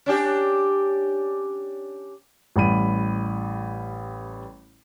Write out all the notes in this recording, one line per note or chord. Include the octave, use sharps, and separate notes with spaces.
C#4 D4 G4
A1 G3 B5 D#7